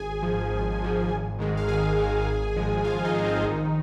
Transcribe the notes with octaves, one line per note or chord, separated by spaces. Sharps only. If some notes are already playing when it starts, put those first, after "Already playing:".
Already playing: G#1 G#4 G#5
G#2 F3
G#1
G#2 F3
G#1
G#2 D#3 G#3
F5
G#1 G#4 G#5
G#2 D#3 G#3
G#1
G#2 F3 G#3
G#1 F4 F5
D#4 D#5
G#2 F3 G#3
C4 C5
A#1 D#3 D#4